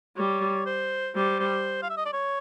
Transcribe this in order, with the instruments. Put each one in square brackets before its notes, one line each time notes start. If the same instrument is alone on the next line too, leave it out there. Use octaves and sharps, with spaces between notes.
[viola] G3 [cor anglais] C#5
[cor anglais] C5
[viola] G3 [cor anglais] C5
[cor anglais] C5
F5
E5
D#5
D5
C#5